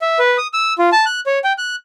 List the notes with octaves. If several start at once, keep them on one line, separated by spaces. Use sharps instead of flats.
E5
B4
D#6
E6
F4
A5
F#6
C#5
G5
F#6